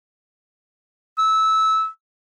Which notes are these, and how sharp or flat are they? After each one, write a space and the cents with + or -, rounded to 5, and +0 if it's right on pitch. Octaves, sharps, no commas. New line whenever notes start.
E6 -20